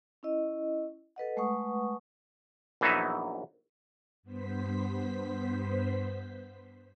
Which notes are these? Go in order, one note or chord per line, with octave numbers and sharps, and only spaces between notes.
C#4 E4 D#5
A4 B4 D#5 F#5
G#3 A3 B4 F#5 C#6 D#6
A#1 E3 F#3 B3 D#4 E5
G2 B3 C5 B6